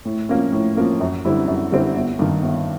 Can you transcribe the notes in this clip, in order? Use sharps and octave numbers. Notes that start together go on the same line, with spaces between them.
A2
F3 A#3 C#4
A2
F3 A#3 C#4
F#2
D3 G3 C4 E4
F#2
D3 G3 C4 E4
G1
G2 D#3
G1